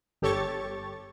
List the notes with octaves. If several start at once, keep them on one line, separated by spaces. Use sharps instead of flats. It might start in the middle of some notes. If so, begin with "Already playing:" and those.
G1 G4 A4 C#5 C#6 A6